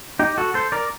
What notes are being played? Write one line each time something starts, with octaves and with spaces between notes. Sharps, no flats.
D#4 G4
F#4 A4
A4 C5
A#4 D5